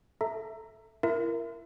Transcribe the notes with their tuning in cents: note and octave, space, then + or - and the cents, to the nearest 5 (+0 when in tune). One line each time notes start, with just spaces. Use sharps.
A4 +0 E5 +0 A#5 -15
E4 +45 A#4 +0 E5 +15